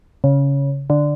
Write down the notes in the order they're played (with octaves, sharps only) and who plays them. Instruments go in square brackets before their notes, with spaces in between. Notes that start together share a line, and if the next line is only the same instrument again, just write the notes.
[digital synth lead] C#3
D3